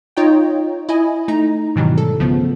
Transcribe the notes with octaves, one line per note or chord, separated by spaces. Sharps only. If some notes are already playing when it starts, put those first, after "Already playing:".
D#4 F4 C#5 D#5 G5
E4 D#5 G#5
A3 D#4 A#5
G#2 B2 D#3 E3 F#3 G3
A4
C2 C#3 F3 A3 B3